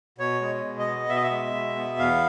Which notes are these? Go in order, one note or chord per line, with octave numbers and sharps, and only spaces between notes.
B2 C#5
G#3
B2
D#5
B3
B2 E5
D#5
E5
G#3
B2
B3
E2 F5